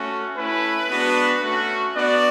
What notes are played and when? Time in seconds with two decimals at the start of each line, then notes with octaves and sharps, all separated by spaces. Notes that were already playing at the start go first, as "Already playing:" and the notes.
Already playing: A3 C#4 F#4
0.36 A3 C#4 E4 B4
0.89 G#3 B3 D4 F#4
1.42 A3 C#4 F#4
1.95 B3 D4 F#4 D5